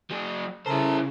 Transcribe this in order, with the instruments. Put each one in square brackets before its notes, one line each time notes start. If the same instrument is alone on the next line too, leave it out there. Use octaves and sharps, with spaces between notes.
[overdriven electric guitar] F#3 G#4
[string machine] C#3 [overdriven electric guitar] E4 C5 [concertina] A4 A#4